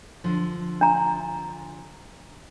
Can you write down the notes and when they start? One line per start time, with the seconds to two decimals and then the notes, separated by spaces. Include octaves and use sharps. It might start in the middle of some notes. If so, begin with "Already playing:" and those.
0.24 D3 F3
0.81 D4 A#5